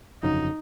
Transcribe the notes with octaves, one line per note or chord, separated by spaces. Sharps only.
G1 F2 C#3 F#3 D#4